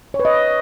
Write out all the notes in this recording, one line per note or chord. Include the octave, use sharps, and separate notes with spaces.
C#5
B4
D#5